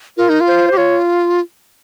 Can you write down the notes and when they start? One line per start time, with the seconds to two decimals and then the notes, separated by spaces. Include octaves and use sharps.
0.17 F4 A#4
0.29 D#4
0.41 F4
0.48 C5
0.68 G4 C5
0.77 F4 C#5